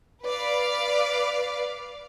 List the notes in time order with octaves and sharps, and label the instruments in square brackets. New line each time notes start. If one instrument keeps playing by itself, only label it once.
[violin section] B4 D5 F5